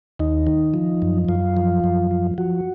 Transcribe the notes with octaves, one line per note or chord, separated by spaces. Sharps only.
D#2 D#4
D#3
F3
F#2
F#2 F4
F3
F#2
F3
F3 F#4